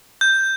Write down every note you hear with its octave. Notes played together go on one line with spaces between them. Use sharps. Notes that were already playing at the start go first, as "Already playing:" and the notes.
G6